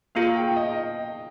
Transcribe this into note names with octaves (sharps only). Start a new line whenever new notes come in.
A#3 F4 G#4 F5
G5
D#5